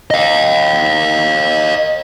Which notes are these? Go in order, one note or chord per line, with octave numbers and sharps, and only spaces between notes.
D#5 F5